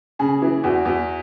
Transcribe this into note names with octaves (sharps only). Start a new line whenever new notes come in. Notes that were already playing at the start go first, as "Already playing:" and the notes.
C#3 G#4
E3
E2 F#4
E2